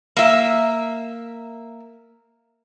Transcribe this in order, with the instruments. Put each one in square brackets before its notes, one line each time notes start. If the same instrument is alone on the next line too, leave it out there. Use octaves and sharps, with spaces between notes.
[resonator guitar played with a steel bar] A#3 E5